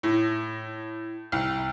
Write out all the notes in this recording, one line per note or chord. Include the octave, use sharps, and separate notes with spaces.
A2
C2